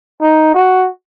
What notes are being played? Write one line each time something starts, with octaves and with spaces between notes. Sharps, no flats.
D#4
F#4